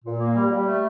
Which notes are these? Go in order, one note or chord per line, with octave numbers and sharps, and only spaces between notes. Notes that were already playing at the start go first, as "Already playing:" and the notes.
A#2
A#3
G3
G3
A3